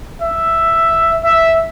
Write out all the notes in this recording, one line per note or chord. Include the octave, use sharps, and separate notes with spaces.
E5
E5